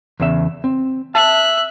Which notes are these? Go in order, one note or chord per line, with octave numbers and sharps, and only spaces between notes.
E2 C#3 E5
C4
E5 A5 F#6